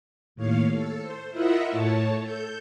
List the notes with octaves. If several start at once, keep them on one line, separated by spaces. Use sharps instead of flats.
D#2 A2 C#5 F5
A4
C5
E4 F4 A#4 D#5 E5 F#5
A2 A3 C#5 A5
A4 G6